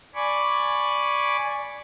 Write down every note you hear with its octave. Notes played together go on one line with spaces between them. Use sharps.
D5 G#5 B5 C#6 D6